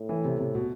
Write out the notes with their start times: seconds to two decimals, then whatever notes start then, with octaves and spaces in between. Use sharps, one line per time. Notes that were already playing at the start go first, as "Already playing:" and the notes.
Already playing: A2
0.09 E3
0.25 C3
0.39 C3
0.55 B2